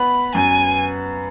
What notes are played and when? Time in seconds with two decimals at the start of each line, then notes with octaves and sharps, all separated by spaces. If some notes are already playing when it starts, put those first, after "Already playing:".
Already playing: B3 B5
0.35 F#2 G#5